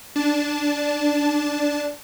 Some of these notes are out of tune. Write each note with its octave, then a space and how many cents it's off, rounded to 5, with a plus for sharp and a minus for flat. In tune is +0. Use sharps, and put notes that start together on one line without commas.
D4 +0 A5 -15